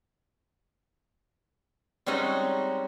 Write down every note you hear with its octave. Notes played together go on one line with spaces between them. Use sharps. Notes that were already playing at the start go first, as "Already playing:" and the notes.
G3 G#3 C4 C#4 D#4 F#4